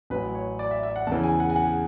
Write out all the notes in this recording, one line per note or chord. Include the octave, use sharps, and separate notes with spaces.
A1 A2 F#3 B4
C#5
D5
E5
E5
F#5
E2 C#3 E3 A5
G#5
F#5
G#5
F#5